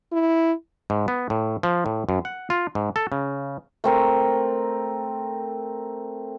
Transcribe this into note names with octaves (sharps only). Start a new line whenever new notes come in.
E4
G#2
B3
A2
F3
A2
F#2
F#5
F4
G#2
A4
C#3
A3 C4 A#4